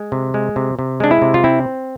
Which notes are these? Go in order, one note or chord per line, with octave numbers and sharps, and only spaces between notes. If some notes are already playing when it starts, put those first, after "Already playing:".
Already playing: G#3
C3
G#3
C3
C3
G#3 D4
E4
C3
F4
C4 E4